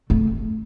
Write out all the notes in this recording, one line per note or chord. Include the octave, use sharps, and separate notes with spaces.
A3